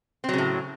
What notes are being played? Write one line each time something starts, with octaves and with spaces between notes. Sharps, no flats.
A2 C#3 F#3 C4